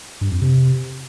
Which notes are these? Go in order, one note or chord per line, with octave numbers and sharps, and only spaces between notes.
G2
F2
C3